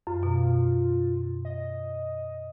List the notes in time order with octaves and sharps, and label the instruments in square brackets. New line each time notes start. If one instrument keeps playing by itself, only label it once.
[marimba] F#2 [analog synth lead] F4
[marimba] B2
[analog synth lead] D#5